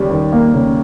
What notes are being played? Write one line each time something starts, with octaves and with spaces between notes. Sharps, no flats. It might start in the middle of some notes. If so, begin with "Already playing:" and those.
Already playing: D#2 C#3 G3
D#2
A#3
C#3